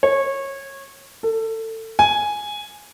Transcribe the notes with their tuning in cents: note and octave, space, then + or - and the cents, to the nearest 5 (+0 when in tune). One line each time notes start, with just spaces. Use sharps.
C#5 -20
A4 +25
G#5 +0